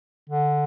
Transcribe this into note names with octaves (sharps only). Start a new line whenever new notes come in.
D3